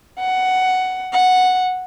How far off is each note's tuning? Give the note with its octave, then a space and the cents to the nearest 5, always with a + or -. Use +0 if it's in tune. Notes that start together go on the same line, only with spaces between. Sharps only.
F#5 +10
F#5 -5